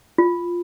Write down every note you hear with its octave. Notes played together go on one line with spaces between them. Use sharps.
F4